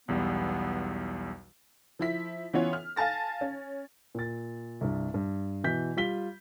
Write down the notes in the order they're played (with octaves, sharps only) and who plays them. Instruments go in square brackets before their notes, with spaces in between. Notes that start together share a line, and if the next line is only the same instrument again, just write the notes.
[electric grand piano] B1 E2 G3 [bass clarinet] B3
[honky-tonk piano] F3 E4 B6
E3 B3 C#4 F4 C#5
F6
F5 G#5 A5 A6 A#6
C#4
[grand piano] A#2 A6
C2 G2
G2
B2 E3 G6 B6
G3 F4 B6 G7